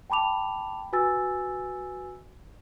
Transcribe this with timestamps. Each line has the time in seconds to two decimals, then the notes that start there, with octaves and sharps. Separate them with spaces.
0.10 G5 A5 B5 D6 F7
0.93 F#4 B4 G#5 E6 A6